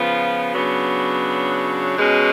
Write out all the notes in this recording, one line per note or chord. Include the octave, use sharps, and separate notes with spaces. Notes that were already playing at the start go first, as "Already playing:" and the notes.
Already playing: C#3 F3 B3 F4
C#3 F#3 B3 D4
B2 G#3 C#4